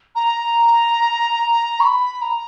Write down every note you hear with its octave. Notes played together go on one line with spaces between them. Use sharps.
A#5
C#6
B5
A#5